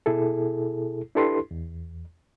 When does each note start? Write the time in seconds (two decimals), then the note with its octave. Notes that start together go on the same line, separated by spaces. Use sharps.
0.06 B2 E4 G#4 A4
1.15 D4 E4 G4 A4 B4 C6
1.51 E2